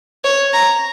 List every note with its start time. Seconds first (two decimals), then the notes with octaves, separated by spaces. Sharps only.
0.24 C#5
0.53 A#5